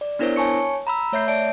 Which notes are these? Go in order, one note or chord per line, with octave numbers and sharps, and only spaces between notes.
D5
B3 D4 E4 A#4 C5 C#5
C#5 G#5 A5 C#6 C#7
A#5 B5 E6
A3 C#5 E5 G6 C7
D5 E5 A5 D7